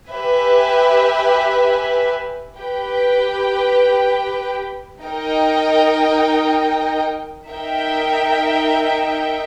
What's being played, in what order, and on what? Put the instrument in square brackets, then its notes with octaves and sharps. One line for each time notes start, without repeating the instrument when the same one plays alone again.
[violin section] G4 B4 E5 G#5
G4 B4 G5
D#4 A#4 D#5 G5
D#4 A#4 E5 G5